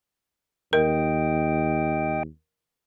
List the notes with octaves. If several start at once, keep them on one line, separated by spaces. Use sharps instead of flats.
D#2 A#4 D#5 G5